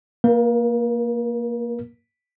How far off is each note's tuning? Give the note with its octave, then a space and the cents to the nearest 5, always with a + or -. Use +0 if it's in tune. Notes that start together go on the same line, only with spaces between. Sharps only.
A#3 +0 A#4 +40